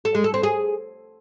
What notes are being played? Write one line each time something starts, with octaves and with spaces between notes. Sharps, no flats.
A4
G#3
A4
C4
G#4